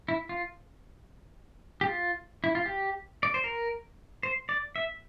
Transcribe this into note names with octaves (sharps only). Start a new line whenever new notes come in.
E4
F4
G4
F4
E4
F4
G4
D5
C5
A#4
C5
D5
E5